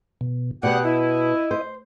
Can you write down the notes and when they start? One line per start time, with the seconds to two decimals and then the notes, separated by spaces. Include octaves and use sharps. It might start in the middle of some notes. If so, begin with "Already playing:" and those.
0.21 B2
0.63 B2 B3 G4 G#4 D5 F#5
0.85 E4 D#5
1.51 C5